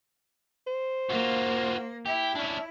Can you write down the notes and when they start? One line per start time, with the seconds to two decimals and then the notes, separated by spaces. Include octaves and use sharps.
0.67 C5
1.09 A#3 F4 F#4
2.06 E4 G4
2.35 C#4 D4